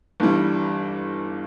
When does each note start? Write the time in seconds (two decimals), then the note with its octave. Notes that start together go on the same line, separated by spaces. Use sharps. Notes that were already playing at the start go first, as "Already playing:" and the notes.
0.20 G1 G2 E3 G3